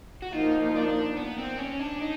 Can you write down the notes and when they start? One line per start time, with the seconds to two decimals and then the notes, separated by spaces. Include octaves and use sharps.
0.22 F#4
0.33 F3 A#3 D#4 F4
0.75 D4
1.16 B3
1.38 C4
1.58 C#4
1.79 D4
2.01 D#4